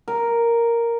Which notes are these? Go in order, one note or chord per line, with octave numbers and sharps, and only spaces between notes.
A#4